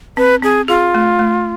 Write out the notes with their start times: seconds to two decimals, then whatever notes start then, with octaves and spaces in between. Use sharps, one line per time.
0.17 C4 B4
0.42 C4 G#4
0.68 F4 G#4
0.94 A3
1.19 A3